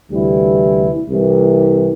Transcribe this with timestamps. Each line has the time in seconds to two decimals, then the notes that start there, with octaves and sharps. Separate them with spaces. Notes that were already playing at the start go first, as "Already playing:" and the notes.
0.11 D2 C3 E3 G3 E4
1.10 C2 C3 E3